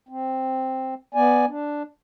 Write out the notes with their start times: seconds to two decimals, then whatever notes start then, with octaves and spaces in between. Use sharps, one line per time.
0.09 C4
1.15 B3 D5 G#5
1.49 D4